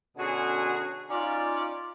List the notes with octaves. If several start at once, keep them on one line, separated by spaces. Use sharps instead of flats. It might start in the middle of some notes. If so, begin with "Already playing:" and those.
B2 D3 C#4 F#4 G#4
C#4 D#4 F4 D5